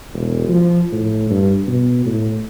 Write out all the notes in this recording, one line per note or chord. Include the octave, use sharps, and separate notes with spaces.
E1
F3
A2
G2
B2
A2